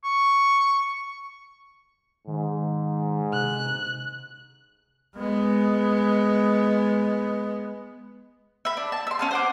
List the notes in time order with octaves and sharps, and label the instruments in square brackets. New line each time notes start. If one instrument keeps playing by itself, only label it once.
[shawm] C#6
[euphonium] G#2 [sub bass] D#3
[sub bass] C3 [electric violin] F#6
[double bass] G#3 B3
[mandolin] E5 B5
D4
A5
E5 C6
C#4 F5 A5
C5 F#5 D6